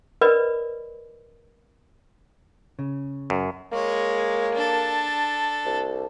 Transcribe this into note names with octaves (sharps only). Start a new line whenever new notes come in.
A#4 B4 D5 D#5 B5
C#3
F#2
G#3 A#3 C#5
D4 A4
C2